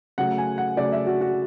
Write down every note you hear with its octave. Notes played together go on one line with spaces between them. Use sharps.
C#3 F#3 A3 F#5
G#5
F#5
C#3 F#3 A3 D5
E5
F#4
F#4